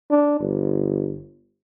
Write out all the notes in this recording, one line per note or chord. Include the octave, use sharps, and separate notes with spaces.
D4
G1